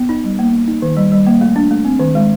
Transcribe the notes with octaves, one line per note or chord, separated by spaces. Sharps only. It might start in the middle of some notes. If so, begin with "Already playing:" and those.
Already playing: B3
D#4
G3
A#3
A#3
D#4
D#3
G3
G3
A#3
A3
D4
A3
C4
D#3
G#3